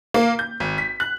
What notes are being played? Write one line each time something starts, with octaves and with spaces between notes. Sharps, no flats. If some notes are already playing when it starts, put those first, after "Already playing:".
A#3
G6
G#1
B6
F#6